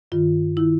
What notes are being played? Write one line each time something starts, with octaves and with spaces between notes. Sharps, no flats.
G2 D#3 F4
D#3 E4